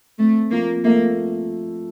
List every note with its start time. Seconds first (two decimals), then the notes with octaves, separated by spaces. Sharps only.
0.19 A3 C4
0.52 F3 A#3
0.85 A3 A#3